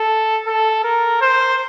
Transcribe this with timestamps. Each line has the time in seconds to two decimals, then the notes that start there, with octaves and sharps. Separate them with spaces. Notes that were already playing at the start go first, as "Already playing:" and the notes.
Already playing: A4
0.47 A4
0.84 A#4
1.21 C5